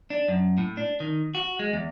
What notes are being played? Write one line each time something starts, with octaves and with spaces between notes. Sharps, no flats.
D4
F#2
A2
D4
D#3
F#4
G#3
E2